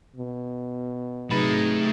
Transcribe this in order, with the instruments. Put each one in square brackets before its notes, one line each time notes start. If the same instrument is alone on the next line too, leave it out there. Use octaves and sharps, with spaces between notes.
[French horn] B2
[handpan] C3 F#3 B4 [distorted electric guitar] A3 B5 [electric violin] D#4 G#4